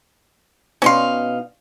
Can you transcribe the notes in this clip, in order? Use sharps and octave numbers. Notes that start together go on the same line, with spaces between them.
B2 C#4 D#4 F5 C6